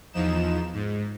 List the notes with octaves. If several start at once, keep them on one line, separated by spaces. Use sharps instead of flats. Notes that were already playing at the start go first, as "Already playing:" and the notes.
E2 F3 D#4 E7
G#2